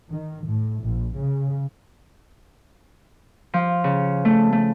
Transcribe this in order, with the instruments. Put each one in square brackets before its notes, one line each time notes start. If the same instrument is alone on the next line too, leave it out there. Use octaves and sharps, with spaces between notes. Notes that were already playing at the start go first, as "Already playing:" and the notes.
[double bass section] D#3
A2
A#1
C#3
[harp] F3
C#3
A3
A3